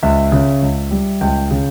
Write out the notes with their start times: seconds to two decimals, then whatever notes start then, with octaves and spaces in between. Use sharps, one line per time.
0.03 C#2 E5
0.32 C#3
0.62 C#2
0.91 G3
1.21 C#2 G5
1.51 C#3